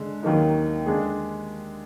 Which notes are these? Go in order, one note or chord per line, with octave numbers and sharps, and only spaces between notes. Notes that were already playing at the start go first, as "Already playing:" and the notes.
Already playing: D3 G#3
D#2 D#3 F#3 A#3 D#4
D3 G#3 D4 G#4